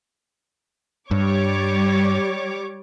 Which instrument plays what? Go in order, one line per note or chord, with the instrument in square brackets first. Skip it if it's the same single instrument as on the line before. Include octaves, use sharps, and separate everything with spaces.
[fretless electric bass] G2 [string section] G3 C#5 D6